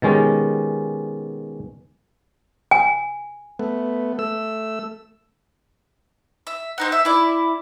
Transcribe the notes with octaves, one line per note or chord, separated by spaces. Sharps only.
B2 D#3 G#3 C#4 G4
G#5
A3 B3
A3 E6
E5
C4 D#4 F#5
E5
E4 D5